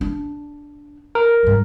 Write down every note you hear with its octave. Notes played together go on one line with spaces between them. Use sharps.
D4
A#4
G#2 G3